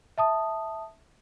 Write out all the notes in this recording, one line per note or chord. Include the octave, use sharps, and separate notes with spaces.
E5 A5 D#6